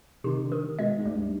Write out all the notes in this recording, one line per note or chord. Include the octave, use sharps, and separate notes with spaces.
C3 D#3
D3
D#3
B2 G#3
G#2
D2
G2